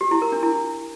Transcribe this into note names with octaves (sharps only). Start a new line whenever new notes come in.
G4
E4
A#4
D4
E4